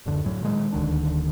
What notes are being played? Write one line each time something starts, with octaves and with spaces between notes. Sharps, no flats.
D1 F#2 D3
A2 F#3
A#2 D#3 G#3
D#1 D2 D#3 D4